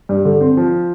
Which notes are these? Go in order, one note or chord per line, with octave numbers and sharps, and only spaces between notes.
G2
D3
C4
F3